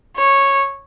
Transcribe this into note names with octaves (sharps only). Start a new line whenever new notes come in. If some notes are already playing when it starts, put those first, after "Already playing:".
C#5